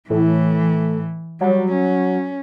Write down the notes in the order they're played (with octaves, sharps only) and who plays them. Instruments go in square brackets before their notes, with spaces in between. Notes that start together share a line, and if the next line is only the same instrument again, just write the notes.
[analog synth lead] A2 [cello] E3
[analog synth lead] F#3 [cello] G3
[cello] C#4